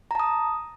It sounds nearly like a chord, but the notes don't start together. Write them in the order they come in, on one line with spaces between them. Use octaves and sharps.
A#5 A5 D#6